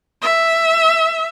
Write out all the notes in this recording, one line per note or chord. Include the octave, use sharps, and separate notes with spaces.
E5